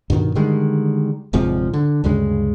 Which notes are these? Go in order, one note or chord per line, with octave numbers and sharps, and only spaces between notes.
G2 B2 D3 D#3
D3 D#3 G3 G#3
D#1 G#2 C3 F3
D3
D2 G2 C#3 G#3